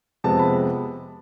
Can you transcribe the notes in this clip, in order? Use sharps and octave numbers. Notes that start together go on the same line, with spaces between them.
F2 C3 G#3 B3 A5
B5